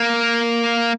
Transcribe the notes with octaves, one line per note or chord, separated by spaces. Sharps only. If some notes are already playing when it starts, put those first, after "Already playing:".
Already playing: A#3